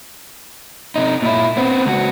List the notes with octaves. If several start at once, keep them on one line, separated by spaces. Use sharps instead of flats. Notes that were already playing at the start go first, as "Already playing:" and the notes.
C3 D#4
A#2 E4
B3 C4
C#2 F#4